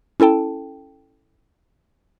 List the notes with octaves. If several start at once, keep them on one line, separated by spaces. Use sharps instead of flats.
C#4 E4 A4 G5 A5